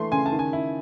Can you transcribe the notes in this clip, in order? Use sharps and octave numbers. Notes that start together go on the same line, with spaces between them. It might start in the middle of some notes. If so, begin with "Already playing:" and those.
Already playing: E3 A3 C6
C#3 G#5
A5
D#3
G#5
E4